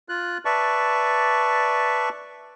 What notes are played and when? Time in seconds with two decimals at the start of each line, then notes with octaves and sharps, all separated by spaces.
0.09 F4 F#6
0.45 B4 D5 E5 A5 C#6